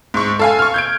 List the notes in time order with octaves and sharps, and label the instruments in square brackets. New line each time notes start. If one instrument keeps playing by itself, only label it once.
[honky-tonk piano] G#2 C#6
A4 F5 G#5
C#6 F6
G6 G#6 D7